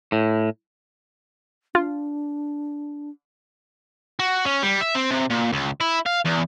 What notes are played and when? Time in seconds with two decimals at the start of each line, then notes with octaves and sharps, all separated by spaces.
0.12 A2
1.75 D4 F4
4.19 F#4
4.46 C#4
4.63 G3
4.81 E5
4.95 C4
5.11 C3
5.30 A#2
5.53 C#2
5.80 E4
6.06 F5
6.25 E2